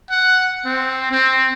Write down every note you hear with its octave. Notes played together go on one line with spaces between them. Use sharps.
F#5
C4
C4